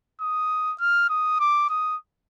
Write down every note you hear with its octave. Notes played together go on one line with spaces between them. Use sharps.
D#6
F6
D#6
D6
D#6